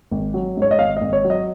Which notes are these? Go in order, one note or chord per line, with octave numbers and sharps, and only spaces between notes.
G#1
F#3
G#2 C#5
D#5
G#1 F5
G#1 D#5
C#5
F#3
D#5